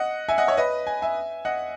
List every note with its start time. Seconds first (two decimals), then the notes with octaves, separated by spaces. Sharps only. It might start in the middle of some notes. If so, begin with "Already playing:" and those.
Already playing: D#5 F#5
0.29 E5 G#5
0.38 D#5 F#5
0.47 C#5 E5
0.57 B4 D#5
0.87 G#5
1.02 E5 G#5
1.45 D#5 F#5